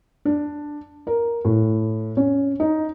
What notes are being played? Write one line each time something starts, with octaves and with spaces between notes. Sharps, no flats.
D4
A#4
A2
C#4
D#4